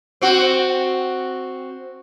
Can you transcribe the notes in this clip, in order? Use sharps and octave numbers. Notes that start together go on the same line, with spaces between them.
C4 F#4